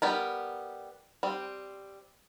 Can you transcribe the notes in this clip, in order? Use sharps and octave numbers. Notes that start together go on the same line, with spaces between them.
G3 B3 A#4
G3 C4